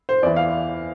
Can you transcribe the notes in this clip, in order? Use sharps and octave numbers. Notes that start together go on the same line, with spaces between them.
C5
E2 E3 D5
F5